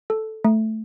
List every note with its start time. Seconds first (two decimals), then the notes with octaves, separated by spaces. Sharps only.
0.10 A4
0.45 A3